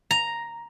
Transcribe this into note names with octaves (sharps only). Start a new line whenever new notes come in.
A#5